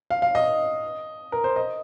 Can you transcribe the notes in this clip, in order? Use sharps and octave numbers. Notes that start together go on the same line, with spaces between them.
F5
F5
D#5
A#4
C5
D#5